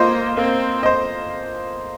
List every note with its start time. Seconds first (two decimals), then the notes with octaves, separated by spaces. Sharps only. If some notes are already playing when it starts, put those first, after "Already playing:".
Already playing: A#3 F4 C5 D#5
0.37 A#3 C4
0.83 C5 D#5